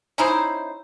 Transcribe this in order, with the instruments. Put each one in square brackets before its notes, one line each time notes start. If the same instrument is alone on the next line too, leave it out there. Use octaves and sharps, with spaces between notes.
[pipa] C#4 D#4 E4 C5